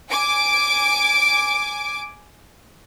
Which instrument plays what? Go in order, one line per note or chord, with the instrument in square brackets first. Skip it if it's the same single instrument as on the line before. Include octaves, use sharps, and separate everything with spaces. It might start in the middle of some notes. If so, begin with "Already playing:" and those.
[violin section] G#5 D6 D7